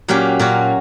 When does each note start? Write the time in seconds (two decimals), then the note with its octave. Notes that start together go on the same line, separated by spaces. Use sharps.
0.08 A#2 F#3 A#3 C#4 G4
0.39 A#2 A#3 C#4 F#4